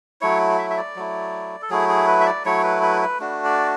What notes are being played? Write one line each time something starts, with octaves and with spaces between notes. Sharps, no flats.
F#3 A3 E4 C#5
E5
E5
D5
F#3 A3 E4
A4
F#3 A3 E4 G#4
G#4
B4
E5
D5
F#3 A3 E4 C#5
B4
B4
B4
A3 D4 F#4
D5